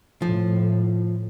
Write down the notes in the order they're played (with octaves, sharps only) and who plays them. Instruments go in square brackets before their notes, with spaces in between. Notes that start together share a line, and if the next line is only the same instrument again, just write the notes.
[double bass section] A2 [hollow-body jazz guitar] F3